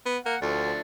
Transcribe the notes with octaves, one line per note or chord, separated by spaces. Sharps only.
B3
A#3 F#5
D2 F3 A3 D4